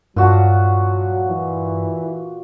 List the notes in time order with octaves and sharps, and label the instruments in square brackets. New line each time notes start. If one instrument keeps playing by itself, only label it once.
[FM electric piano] G2 [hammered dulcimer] A#2 F#4 A5 [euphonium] F#3
[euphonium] E3